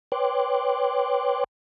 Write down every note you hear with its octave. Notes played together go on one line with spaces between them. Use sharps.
B4 C#5 G5 C6 D6 F#6